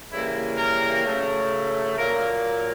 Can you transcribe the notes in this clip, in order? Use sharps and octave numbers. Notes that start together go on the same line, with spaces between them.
C#3 E3 G3 A#3 E4
A#4
C#3 F#3 A3
A#2 F#3 A#3 A#4